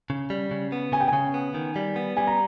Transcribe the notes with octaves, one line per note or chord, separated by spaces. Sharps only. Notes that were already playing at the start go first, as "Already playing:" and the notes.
C#3
G3
C#3
B3
C#3 G#5
G5
G#5
C#3
B3
D#3
G3
B3
G3 G#5
A#5